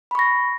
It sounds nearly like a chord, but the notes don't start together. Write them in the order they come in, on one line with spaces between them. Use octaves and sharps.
B5 C#6 A#6